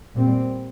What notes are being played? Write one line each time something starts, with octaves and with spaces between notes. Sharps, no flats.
A#2 G3 C4